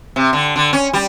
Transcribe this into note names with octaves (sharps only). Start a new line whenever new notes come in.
C3
D3
D3
C#4
G3